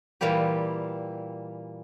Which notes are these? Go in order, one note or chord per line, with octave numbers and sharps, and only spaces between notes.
A#2 E3 G3 A#3 G4